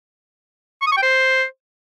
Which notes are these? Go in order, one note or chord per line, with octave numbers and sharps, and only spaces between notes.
C#6
D#6
C#6
G5
C5